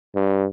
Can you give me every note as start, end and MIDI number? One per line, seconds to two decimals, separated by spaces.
0.15 0.45 43